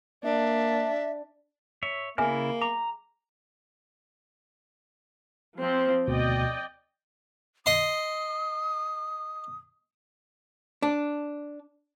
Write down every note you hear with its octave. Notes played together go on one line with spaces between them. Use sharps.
A#3 D4 E5
C#5 E5
C#3 A#3 E4 G#4 E5 G#5 F6
A#5 D6
F3 C4
D2 B2 D5 D#5 G5
D#5 C6 D#6
D4